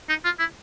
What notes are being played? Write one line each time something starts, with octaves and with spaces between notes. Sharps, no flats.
D#4
F4
E4